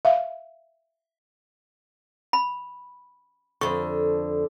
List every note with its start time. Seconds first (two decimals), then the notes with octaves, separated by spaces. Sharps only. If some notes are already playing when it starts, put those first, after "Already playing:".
0.05 E5 F5
2.33 B5
3.61 F2 D3 C#6